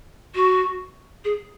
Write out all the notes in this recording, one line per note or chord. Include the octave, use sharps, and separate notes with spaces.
F#4
G#4